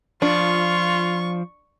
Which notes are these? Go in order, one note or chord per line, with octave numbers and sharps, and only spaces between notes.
F3 D4 F4 C#6